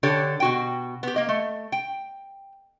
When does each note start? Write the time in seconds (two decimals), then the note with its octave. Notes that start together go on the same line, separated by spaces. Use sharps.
0.03 D3 G4 A4 C#5
0.40 B2 F#4 G5
1.03 B3 G4
1.16 A#3 D#5
1.29 A3
1.72 G5